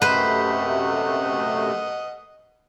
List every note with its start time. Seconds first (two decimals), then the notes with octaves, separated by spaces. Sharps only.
0.02 F#2 C3 A3 B4 C5 D#5 F#5